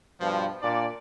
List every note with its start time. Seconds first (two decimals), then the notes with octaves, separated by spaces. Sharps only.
0.20 G2 B2 F3
0.62 A#2 D4 D5